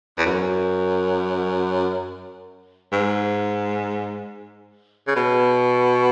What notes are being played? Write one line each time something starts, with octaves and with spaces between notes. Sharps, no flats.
E2
F#2
G#2
C#3
B2